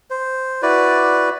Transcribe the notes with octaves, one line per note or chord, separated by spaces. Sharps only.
C5
E4 F#4 B4 D5